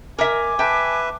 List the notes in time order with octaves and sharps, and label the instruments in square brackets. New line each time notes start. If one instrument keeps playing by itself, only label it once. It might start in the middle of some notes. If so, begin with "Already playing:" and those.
[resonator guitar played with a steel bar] A#4 E5 [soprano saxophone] G#5 [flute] D6
[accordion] B4 E5 [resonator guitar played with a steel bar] G5 A5